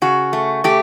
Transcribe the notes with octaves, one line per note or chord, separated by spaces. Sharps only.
C#3 F#4
A3
A3 G4